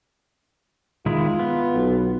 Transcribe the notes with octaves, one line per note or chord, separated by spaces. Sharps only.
D#3 G#3 E4 F4
B3
B1